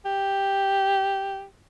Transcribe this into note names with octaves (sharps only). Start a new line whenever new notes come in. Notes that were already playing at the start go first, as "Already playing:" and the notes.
G4